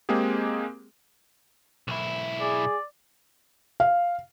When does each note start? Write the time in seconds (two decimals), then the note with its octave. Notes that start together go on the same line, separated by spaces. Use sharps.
0.09 G#3 A#3 C4 G4 G#4
1.88 B1 E4
2.40 G#4 D5
3.80 F5